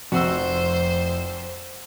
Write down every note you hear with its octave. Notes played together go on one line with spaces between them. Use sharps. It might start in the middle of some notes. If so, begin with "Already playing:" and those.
F1 F2 F#4 C5 E6